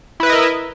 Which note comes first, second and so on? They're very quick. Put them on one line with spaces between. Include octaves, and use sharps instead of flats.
E4 B4 E5 D#5 A#4